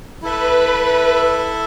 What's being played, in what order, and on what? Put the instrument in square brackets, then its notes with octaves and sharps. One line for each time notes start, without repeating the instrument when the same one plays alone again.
[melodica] E4 A4 E5 [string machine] B4